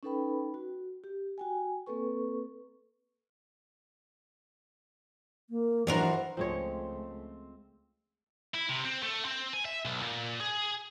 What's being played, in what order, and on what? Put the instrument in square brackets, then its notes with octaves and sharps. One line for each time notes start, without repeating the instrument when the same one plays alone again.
[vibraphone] C#4 D#4 A4 B4 G5 B5
F#4
G4
F#4 G5 G#5
A#3 C4 A4 B4 C#6
[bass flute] A#3
[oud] F#2 D4 A#4 [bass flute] E3 [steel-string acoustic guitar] F3 F#4 C5
[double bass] C#2 A3 [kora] F3 G#3 C#5 [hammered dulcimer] C4 C5
[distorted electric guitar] E4
C3
C4
A3
C4
G#5
E5
B1
A#2
G#4